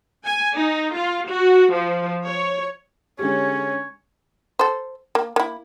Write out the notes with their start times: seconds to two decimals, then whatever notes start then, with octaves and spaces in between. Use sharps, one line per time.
0.24 G#5
0.56 D#4
0.95 F4
1.28 F#4
1.73 F3
2.25 C#5
3.19 D3 G#3 C#4 G4 C#5
4.59 A4 C5
5.15 A#3
5.36 A#3 E4